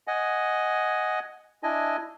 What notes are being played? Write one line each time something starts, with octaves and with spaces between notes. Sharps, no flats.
D#5 F#5 G#5
D4 E4 D#5 G#5